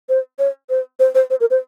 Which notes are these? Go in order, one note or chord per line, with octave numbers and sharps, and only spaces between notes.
C5
C#5
C5
C5
C5
C5
A#4
C5